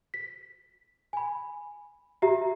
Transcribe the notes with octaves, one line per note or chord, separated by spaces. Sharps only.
B6
G#5 B5
F#4 G4 E5 A#5